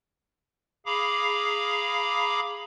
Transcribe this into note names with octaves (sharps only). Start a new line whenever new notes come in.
G#4 F5 A#5 B5 D6